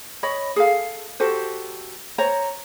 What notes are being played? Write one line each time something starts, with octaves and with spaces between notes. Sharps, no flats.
C#5 D#5 B5
G#4 A4 F5
F#4 G4 A4 C5
C5 C#5 A#5